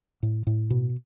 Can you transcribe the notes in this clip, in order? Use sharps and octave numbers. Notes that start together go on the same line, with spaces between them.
A2
A2
B2